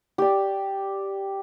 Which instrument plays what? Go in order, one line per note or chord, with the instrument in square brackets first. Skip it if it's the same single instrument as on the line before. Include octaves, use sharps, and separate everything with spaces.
[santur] G4 D5